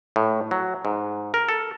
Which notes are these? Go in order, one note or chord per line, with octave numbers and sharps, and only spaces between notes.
A2
F#3
G#2
A#4
A4